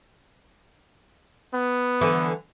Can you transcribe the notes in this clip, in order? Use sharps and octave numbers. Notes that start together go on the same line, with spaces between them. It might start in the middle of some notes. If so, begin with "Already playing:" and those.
B3
D3 E3